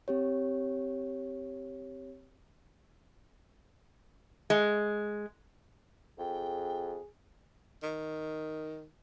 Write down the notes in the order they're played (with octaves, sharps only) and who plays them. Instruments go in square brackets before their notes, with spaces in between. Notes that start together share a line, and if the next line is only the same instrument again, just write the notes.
[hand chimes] C4 G4 C#5
[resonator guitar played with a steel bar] G#3
[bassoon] F2 [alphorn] G#4 [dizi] G5
[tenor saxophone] D#3